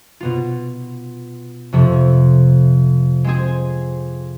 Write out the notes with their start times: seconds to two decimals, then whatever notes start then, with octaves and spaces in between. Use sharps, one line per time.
0.20 B2 B3 F4
1.72 F2 C3 F3 A3
3.24 G#3 C4 G#4